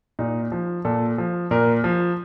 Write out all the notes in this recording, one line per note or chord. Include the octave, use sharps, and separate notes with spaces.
A#2 D#4
F3
A#2 A4
F3
A#2 A#4
F3